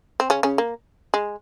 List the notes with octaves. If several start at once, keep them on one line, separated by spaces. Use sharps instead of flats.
C4
C#3 C#4
C#3 C#4
A#3
G#3